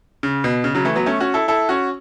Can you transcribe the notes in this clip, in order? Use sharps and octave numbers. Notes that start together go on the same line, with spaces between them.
C#3
B2
C#3
C#3 F#3
E3 A3
F#3 B3
A3 C#4
C#4 F#4
E4 A4
E4 A4
C#4 F#4